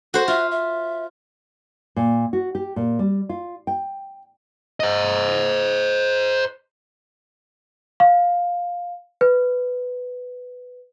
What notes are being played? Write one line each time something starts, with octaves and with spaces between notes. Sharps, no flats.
F#4 A4 C5
F4 E5
E5
A#2
F#4
G4
A#2
G3
F4
G5
C5 D#5
F5
B4